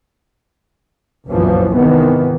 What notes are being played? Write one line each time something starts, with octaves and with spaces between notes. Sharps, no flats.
G1 C2 F#2 A#2 E3 F3
G#1 C3 D#3 E3 B3